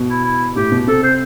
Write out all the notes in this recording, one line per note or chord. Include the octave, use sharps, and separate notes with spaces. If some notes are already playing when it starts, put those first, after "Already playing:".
Already playing: B2
E4
E4
A2 G4
B2
C3 A4
C5